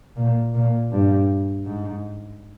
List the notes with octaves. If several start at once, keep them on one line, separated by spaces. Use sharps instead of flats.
A#2
A#2
G2
G#2